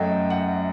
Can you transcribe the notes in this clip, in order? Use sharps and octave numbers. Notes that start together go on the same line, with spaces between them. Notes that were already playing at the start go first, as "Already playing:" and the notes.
Already playing: F#2 F#3 A3 D#5 G5
F#5